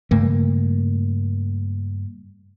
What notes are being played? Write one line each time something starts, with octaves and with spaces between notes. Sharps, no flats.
G2 C#3 A3 A#3